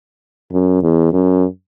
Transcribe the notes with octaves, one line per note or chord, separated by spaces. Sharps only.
F#2
E2
F#2